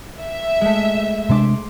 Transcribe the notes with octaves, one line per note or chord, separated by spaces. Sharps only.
E5
G#3 A3
C3 G#3 D4 C6 D6